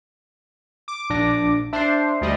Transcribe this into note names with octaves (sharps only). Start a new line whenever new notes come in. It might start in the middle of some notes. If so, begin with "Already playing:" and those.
D6
A#1 D4 A#6
D4 C5 E5 C7
D2 G3 D#5